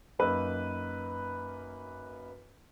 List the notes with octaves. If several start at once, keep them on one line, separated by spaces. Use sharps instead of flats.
F#2 A#3 D#4 B4 E6